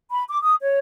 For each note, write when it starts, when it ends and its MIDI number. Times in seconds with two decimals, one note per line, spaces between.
0.11 0.23 83
0.29 0.41 86
0.42 0.54 87
0.61 0.79 73